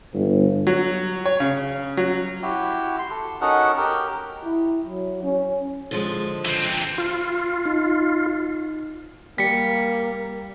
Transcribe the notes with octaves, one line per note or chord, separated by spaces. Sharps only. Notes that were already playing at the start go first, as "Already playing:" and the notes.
G1
F#3
C#5
C#3
F#3
E4 F#4 G4
C6
A4
C#4 D#4 F#4 A4 A#4 F#5
G4 A#4
E4
F#3
C#4
D3 F3 G#3
E3 C4
F4
D#4
G3 A#3 B6 C#7